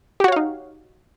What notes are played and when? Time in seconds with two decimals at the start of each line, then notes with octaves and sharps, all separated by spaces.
0.20 G4
0.24 F#4
0.28 C#5
0.32 F5
0.36 D#4